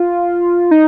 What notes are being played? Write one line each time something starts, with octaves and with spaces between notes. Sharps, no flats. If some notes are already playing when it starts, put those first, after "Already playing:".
Already playing: F4
D#4